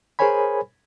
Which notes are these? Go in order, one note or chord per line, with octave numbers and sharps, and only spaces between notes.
G#4 A#4 C5 C#5 G#5 B5